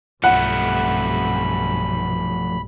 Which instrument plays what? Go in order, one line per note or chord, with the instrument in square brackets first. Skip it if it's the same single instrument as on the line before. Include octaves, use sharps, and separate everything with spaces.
[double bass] B1 G2 [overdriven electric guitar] F3 A3 [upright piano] F#5 [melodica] B5